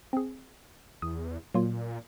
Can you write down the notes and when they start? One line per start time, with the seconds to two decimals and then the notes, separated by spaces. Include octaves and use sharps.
0.13 C4 G#4
1.02 E2 D#6
1.55 A#2 F#3 A#3 F4